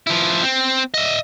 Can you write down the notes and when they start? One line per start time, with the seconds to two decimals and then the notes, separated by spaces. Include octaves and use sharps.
0.07 F3 E4
0.43 C4
0.94 D#5 E5